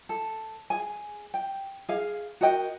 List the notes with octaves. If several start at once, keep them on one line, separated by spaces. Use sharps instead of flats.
A4
G#4 G#5
G5
G#4 F5
F#4 A#4 D#5 G5